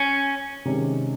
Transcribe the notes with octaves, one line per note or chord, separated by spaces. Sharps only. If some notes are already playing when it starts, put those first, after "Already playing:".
Already playing: C#4
C3 D#3 G#3 C#4